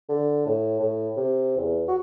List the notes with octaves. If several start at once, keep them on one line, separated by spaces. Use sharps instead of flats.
D3
A2
A2
C3
E2
F#4